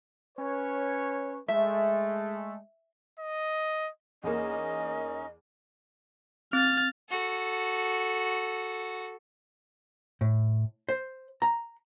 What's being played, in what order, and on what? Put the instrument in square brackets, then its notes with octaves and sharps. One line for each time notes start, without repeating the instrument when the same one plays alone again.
[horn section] C#4 B4 C#5
[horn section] G#3 A3 [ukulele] E5
[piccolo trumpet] D#5
[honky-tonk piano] E2 A#3 [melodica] C#4 D#4 [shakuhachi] D#5
[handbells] C4 [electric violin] F6 A6
[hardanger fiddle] F#4 A4
[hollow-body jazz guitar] A2
C5
A#5